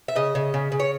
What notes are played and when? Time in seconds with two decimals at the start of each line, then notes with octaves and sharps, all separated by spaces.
0.08 E5
0.16 C#3 D#5
0.35 C#3
0.54 C#3
0.72 C#3
0.80 C#5